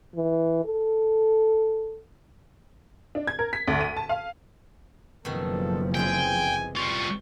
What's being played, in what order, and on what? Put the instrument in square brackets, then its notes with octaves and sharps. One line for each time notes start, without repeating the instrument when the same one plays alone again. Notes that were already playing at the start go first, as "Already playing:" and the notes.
[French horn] E3
A4
[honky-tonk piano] D4
G#6
A#4
B6
D2
D#7
A5
F5
[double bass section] F#1 F3 [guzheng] B2 D#3 A3 [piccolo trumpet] A4
[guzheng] C3 E3 G#3 [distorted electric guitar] G5 [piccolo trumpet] G#5
[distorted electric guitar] G3 F4 [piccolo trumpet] C#6